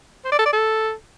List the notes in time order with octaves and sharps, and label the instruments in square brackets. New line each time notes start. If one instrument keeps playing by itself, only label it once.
[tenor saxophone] C5
D5
A4
D5
A4